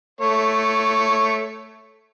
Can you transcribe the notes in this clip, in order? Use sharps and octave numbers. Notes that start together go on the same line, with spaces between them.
A3 C#5